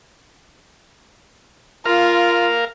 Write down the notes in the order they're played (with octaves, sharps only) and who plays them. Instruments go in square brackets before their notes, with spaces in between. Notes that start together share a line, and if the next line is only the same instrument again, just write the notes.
[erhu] F4 [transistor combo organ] A#4 F5